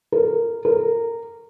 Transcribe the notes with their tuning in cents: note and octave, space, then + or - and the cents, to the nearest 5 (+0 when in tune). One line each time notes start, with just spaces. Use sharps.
A#4 -10
A#4 -15